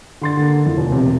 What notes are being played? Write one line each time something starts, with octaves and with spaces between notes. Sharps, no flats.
D3 C6 A6
D3 A#3
F2 E4
F1
E1 C3 D#3